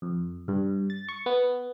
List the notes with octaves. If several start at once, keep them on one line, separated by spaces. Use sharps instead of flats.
F2
G2
A6
C#6
B3